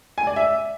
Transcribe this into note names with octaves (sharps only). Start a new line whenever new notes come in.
G#5
D5
E5